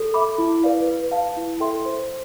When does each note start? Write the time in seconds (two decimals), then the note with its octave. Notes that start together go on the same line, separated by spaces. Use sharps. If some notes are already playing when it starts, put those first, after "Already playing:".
Already playing: A4
0.14 E5 B5 D6
0.38 E4
0.63 B4 D5 F5
0.87 B4
1.12 F5 A5
1.37 E4
1.60 A4 E5 G5 C6
1.86 C5